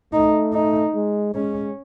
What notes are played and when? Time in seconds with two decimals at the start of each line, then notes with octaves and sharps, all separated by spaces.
0.13 A3 D#4
0.54 D#4
0.94 G#3
1.35 G#3 C#4